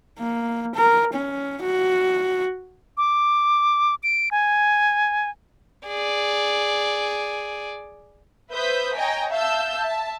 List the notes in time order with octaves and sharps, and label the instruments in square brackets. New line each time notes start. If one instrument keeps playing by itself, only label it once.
[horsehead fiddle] A#3
A#4
C#4
F#4
[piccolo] D6
D7
G#5
[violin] G#4 D5
[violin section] B4 C5 E5 D#6 G6 B6
C#5 D#5 G5 G#5 A#5
E5 F5 A5 E6 G6
E5 A5